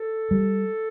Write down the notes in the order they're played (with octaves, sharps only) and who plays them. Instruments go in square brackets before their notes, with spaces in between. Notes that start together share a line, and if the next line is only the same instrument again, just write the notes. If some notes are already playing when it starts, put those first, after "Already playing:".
Already playing: [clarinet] A4
[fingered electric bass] G3